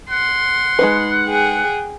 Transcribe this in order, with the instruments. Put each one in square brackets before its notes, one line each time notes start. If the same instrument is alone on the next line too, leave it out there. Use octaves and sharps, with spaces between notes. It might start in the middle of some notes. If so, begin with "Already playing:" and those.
[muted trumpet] F#5 [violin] C6
[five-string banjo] G#3 D#4 B4
[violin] G#4 G5